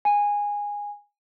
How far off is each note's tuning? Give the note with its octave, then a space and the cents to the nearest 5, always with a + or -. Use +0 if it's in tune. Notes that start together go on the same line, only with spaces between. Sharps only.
G#5 -15